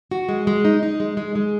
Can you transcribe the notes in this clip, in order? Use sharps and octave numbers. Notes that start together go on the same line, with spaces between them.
F#4
G#3
G#3
D#4
D#4
G#3
G#3
G#3